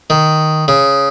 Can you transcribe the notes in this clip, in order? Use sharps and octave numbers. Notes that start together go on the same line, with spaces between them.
D#3
C#3